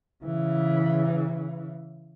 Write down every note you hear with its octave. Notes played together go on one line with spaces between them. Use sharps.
C#3 E3